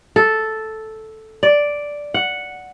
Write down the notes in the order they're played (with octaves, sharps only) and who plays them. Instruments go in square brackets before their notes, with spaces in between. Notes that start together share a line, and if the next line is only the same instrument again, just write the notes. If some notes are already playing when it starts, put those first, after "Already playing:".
[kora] A4
D5
F#5